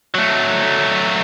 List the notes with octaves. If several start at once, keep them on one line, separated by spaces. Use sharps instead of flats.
F#3 A3